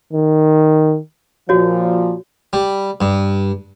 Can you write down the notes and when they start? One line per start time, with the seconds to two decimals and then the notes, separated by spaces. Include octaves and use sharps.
0.13 D#3
1.49 A#2 F3 F#4 C#5
2.53 G3
3.01 G2